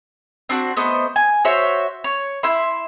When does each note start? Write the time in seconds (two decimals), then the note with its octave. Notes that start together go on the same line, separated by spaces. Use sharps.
0.49 C4 D4 F#4
0.77 A3 B3 C5 D#5
1.16 G#5
1.45 F#4 C5 C#5 E5
2.04 C#5
2.43 E4 E5 C6